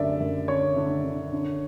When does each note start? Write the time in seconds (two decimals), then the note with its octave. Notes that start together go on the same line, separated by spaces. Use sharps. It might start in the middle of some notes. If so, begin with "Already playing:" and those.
Already playing: F#2 D3 D5 E5
0.20 F#2
0.48 D3 C#5
0.76 D3
1.05 D3
1.32 D3